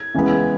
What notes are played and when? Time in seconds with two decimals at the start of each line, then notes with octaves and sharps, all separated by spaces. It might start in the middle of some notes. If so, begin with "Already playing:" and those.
Already playing: G#6
0.14 C#3 E3 G#3 B3